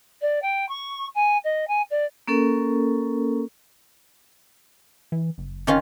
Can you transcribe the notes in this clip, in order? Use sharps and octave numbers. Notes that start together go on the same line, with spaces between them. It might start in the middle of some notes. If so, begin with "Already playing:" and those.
D5
G5
C#6
G#5
D#5
G#5
D5
A#3 C#4 A4 A#4
E3
F#1
D#3 C#4 F4